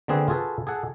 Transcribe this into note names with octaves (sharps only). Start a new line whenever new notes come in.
D3 A#3 C4 G#4 B4
F4 F#4 G#4 A4 B4
G#4 A4 F#5